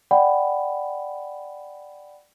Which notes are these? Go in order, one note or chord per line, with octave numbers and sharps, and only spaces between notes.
D5 F#5 G5 B5